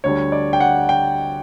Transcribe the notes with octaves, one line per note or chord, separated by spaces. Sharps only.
D2 D3 G3 C#5
D5
G5
F#5
G5